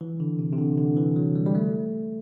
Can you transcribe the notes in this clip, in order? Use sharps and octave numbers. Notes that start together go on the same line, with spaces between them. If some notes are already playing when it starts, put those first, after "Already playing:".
E3
D3
C3
C3
D3
D3
E3
F#3
G3
G3
A3